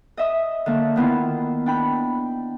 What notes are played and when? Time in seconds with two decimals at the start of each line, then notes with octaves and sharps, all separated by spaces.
0.17 D#5 E5 D#6
0.66 D3 A#3 E5
0.96 D#3 B3 E4 F4
1.66 D4 G5 B5